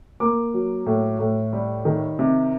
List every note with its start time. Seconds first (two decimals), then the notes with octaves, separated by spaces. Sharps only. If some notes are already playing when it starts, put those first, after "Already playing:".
0.20 A#3 D6
0.54 F#3
0.86 A2
1.19 A2
1.53 G3
1.85 D#3
2.19 C3